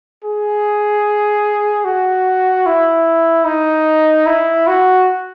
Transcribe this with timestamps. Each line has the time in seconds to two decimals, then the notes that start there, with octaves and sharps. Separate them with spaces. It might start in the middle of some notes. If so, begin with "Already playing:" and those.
0.24 G#4
1.85 F#4
2.66 E4
3.46 D#4
4.27 E4
4.67 F#4